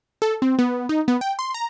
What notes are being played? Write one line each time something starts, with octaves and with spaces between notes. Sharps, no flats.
A4
C4
B3
D#4
B3
G5
C6
A#5